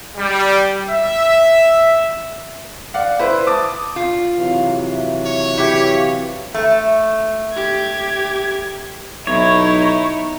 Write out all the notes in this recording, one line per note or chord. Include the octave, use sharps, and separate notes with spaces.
G3
E5
D5 F5 F#5
E4 B4 C5
A5 D6 D#6 A6
F4
C3 E3 F#3 F5
E5
C#5
E4 G4 D6
F5
A3
G4 G#6
B1 D#4 E4 C#5